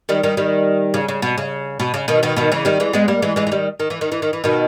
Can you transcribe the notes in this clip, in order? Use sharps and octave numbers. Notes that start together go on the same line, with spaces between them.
D#3 G3
D#3 G3
D#3 G3
C#3
C#3
B2
C#3
B2
C#3
B2 D#3
B2 D#3
B2 D#3
C#3 E3
D#3 G3
E3 G#3
G#3 B3
G3 A#3
E3 G#3
E3 G#3
E3
D#3 G3
D#3
E3
D#3
E3
D#3
E3
B2 D#3